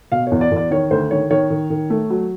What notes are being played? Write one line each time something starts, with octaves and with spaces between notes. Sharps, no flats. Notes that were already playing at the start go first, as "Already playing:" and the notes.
B2 F5
E2 C#5
D5
E2 D5
D#3 C#5
D2 C5
D#3 C#5
D#3 C#5
D#3
D#3
A3
F#3